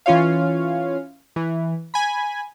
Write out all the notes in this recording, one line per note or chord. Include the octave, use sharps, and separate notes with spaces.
E3 C#4 F4 C#5 F5
E3
G#5 B5